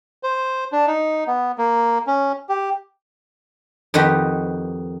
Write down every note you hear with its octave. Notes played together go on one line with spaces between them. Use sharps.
C5
D4
D#4
B3
A#3
C#4
G4
F2 D#3 D#4 F#4 G4 B4